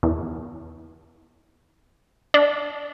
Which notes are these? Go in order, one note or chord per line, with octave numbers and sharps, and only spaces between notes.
E2
D4